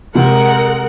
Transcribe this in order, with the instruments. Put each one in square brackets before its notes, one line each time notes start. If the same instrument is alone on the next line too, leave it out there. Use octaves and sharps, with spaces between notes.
[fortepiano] C3 [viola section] G#3 A#4 F#5